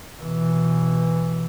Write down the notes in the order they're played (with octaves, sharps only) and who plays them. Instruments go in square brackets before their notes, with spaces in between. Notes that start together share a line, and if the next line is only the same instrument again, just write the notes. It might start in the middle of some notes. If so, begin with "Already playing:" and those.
[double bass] B2 E3